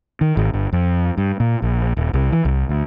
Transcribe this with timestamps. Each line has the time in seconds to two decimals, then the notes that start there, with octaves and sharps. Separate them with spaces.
0.21 D#3
0.37 G#1
0.53 G1
0.72 F2
1.17 G2
1.40 A#2
1.62 A#1
1.97 D#1
2.13 C2
2.32 E3
2.45 C2
2.69 D2